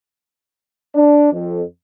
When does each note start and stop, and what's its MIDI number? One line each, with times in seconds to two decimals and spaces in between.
0.95 1.32 62
1.33 1.62 41